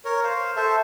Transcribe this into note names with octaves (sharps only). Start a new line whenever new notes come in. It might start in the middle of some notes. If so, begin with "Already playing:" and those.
A#4 C#5
C5 F5
A4 C5 E5